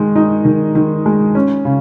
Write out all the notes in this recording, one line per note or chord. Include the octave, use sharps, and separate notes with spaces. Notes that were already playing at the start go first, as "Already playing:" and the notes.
Already playing: D#3 G#3
D#4
D#3
D#3
G#3
C#4
C#3